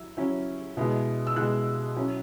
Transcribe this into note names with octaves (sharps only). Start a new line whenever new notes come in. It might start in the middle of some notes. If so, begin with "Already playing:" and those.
Already playing: F#3 E4 E6
F#3 C#4 E4
B2 G#3 E4
E6
B2 G#3 E4 F#6
F#3 C#4 E4